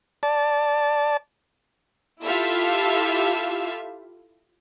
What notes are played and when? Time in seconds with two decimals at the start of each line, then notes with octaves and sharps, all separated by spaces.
0.23 D5 A5
2.22 E4 F4 G4 A4 E5 F5